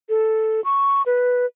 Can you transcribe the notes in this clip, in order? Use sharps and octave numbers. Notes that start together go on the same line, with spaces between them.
A4
C#6
B4